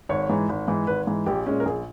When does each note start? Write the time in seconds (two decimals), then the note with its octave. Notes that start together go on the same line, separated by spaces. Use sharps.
0.09 G#1 C#5
0.29 G#2 E3
0.49 G#1
0.68 G#2 E3
0.87 G#1 B4
1.07 G#2 E3
1.26 A#1 G4
1.46 A#2 G#3 C#4
1.60 A#4
1.65 A#1 G#4